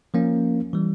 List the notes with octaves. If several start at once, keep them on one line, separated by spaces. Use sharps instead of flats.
F3 A#3 C#4
E3 G3